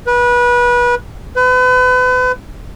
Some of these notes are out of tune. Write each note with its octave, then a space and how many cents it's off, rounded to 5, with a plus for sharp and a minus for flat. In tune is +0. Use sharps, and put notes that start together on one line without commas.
B4 -25
B4 +35